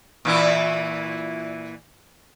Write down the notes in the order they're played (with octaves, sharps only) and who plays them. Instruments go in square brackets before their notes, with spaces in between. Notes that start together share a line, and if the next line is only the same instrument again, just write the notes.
[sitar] A#2 E3 E4